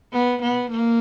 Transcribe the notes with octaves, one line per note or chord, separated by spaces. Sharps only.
B3
B3
A#3